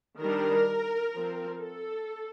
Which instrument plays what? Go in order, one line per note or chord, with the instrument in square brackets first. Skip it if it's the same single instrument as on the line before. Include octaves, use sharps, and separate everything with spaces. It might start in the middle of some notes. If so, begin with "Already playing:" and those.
[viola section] D#3 G3 D4 A#4
F3 C4
A4